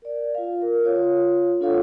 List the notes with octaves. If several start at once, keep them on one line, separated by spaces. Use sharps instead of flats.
A#4 D5
F4 F5
A#4
F4 C#5 F5
D4 F4 A4 C#5 F5 F#5